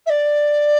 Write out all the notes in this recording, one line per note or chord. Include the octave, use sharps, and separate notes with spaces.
E5
D5